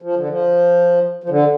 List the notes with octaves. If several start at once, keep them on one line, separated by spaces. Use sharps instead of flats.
F3
D3
F3
F3
D3